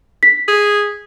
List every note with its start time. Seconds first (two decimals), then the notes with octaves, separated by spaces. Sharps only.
0.23 B6
0.48 G#4